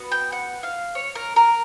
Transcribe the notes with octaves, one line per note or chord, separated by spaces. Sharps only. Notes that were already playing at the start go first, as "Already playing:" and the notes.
Already playing: B3 F#4
G5
F#5
F5
C#5
A#4
A#4